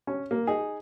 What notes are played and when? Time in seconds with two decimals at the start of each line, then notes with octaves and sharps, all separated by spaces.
0.07 C#4
0.31 A#3
0.47 D#4 G#4